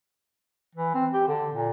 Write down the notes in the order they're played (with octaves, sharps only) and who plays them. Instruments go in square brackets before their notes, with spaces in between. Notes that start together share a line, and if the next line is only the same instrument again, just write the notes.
[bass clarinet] E3
C4
G4
D3
A#2